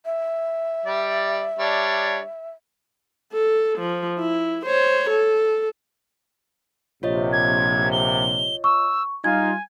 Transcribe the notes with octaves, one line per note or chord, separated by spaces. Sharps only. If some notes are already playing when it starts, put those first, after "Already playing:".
E5
G3 D5
G3 D4 C#5
A4
F3
E4
C5 C#5
A4
A#1 C3 F4 C#5 D#5
G#6
G7
C#6 E6
G3 D#4 F4 G#5 G#6